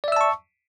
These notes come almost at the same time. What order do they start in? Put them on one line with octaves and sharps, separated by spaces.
D5 E5 E6 A5 C#6